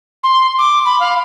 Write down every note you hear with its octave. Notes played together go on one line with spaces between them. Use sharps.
C6
D6
B5
F5